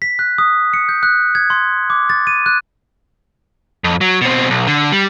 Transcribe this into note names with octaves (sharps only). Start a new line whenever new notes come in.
B6
F#6
D#6
C#7
G6
F#6
G#6
C6
D6
A6
D#7
F#6
F2
F#3
B2 C4
B1
D3
G3